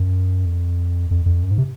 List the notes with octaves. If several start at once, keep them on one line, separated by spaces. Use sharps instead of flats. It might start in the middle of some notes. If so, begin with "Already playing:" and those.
Already playing: F#2
F2
F2
F2
F#2
G#2
C3